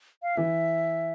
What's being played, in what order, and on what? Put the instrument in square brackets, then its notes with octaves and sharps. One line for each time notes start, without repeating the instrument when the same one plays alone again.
[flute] F5
[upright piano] E3 [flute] E5